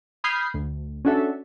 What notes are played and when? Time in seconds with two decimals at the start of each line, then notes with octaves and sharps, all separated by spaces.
0.24 B5 D#6 F6 G6 G#6 C7
0.54 D2
1.05 C#4 D4 F#4 A4 E5